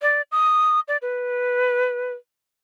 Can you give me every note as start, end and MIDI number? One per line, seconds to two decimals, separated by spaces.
0.02 0.22 74
0.32 0.80 87
0.88 0.97 74
1.02 2.13 71